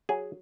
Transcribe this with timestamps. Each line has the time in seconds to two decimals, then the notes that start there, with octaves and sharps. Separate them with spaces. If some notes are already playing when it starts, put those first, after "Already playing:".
0.09 F#3 G#4